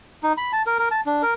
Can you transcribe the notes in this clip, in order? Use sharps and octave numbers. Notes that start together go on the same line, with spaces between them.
D#4
B5
A5
A#4
A#4
A5
D4
A#4